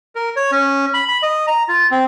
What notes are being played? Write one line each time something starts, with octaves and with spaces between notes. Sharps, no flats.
A#4
C#5
C#4
B5
B5
D#5
A#5
F4
C4